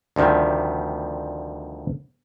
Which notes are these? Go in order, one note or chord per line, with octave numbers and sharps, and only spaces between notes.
D2 C3 D#3 F3 G3